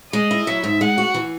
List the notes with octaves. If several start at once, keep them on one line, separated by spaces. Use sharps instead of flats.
G#3 D#5
E4
F#3 E5
G#2
G#3 F#5
F#4
E3